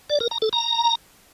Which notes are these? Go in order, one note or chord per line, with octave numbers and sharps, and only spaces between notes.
D5
A#4
A#5
A4
A#5